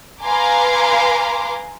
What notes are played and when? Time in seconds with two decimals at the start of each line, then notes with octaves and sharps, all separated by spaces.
0.23 B4 F5 G#5 A#5 C6 D6